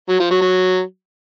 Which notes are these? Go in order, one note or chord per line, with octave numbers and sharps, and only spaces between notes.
F#3
F3
F#3
F#3